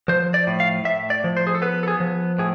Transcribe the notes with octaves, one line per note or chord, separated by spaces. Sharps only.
F3 C5
D5
A2
F5
A2 E5
D5
F3
C5
G#4
A4
B3 B4
A4
G#4
F3
A2 G#4